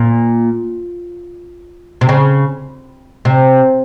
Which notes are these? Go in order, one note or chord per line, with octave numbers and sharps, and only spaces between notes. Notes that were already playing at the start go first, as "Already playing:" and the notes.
Already playing: A#2
C3
C#3
C3